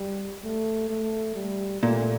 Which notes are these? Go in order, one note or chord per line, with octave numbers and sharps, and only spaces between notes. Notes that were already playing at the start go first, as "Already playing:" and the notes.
Already playing: G3
A3
A3
G3
A#2 A3